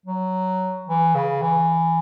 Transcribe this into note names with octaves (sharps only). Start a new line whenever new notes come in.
F#3
E3
C#3
E3